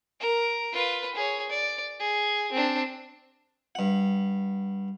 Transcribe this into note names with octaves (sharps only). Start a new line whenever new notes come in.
A#4
F4 B4
G#4 C#5
D5
G#4
C4 D4
G2 F#5